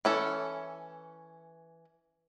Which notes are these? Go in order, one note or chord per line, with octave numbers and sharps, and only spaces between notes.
E3 C#4 A4